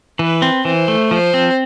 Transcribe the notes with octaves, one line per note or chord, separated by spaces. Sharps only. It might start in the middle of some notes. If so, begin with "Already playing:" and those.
E3 B4
C4
E3 C5
A3
F3 C5
C4